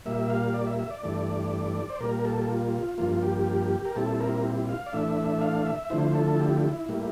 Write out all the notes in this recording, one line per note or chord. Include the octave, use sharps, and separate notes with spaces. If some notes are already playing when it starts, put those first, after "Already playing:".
A#2 G3 A#3 E5
F5
D5
E5
E5
D5
G2 E3 A3
C5
A#2 G3 A#3 A#4
A#4
A4
F4
G2 F3 A#3 F4
F4
G4
A#4
A#2 G3 C4 E4 A4
A#4
F5
D5
A2 E3 A3 D4 E5
F5
E5
D3 F3 A3 E4 C5
A4
G4
E4
A2 G3 A#3 E4